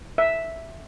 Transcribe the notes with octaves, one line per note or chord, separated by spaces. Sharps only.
E5